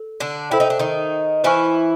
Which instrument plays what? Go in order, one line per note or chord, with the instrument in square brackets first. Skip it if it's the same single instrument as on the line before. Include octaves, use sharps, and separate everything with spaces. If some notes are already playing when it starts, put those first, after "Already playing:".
Already playing: [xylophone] A4
[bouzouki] D3 D4
[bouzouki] E4 [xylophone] A4 C5 E5 G5
[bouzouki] D#4
D4
D#3 D#4
[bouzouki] E3 E4 [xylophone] C5 E5 G#5 C#6 F6